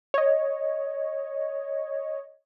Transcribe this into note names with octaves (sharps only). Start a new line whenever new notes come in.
C#5 D#5